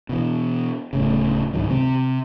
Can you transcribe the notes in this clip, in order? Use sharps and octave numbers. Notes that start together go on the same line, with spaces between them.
B2 E3
D1 A2 C#3
C#2 G#2 D#3 F#3
C3 C4